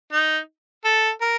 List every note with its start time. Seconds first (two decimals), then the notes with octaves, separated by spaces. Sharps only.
0.13 D#4
0.85 A4
1.21 A#4